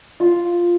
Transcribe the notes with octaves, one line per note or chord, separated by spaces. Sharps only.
F4